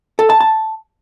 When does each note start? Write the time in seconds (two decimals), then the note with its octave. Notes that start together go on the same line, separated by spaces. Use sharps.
0.19 A4
0.30 A5
0.41 A5